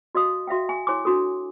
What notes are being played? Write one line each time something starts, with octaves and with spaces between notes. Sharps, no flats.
F#4 D#5 F5 D#6
F#4 E5 F5 G5
G#5
E4 C#5 G#5 C6 D6
D4 F#4 A4